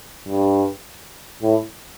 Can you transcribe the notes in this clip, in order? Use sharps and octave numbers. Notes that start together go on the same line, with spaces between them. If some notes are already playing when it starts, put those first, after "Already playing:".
G2
A2